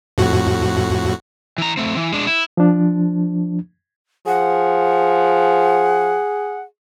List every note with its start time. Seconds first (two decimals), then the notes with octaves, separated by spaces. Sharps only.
0.18 F2 A2 F#4
1.58 E3 A#5
1.77 A3 C4
1.97 E3
2.12 G#3 D4
2.27 E4
2.57 F3 D4
4.27 F3 G#4 F#5